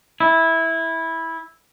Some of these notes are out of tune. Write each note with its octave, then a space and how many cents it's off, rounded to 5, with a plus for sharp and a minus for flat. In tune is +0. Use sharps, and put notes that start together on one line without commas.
E4 -10